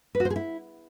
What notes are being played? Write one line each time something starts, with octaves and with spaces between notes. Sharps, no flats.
B4
F#4
C5
G#4
E4